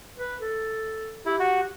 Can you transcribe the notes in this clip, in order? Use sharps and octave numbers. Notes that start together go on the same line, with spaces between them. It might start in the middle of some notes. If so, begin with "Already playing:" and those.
B4
A4
E4 G4
F#4